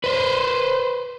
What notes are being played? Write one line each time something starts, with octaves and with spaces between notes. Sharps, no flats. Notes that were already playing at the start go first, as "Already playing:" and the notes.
B4 C5